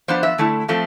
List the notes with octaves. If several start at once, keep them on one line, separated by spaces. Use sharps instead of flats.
F3 B3 D4 C5
E5
D3 A3 E4
F3 A3 C4